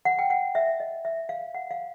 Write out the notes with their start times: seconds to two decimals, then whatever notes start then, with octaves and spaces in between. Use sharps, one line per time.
0.05 F#5
0.19 G5
0.30 F#5
0.55 E5
0.80 D#5
1.05 E5
1.29 F5
1.55 F#5
1.71 F5